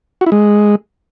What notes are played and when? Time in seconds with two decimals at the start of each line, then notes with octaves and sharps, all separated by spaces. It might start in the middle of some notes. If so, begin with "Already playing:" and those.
0.21 F#4
0.26 E4
0.32 G#3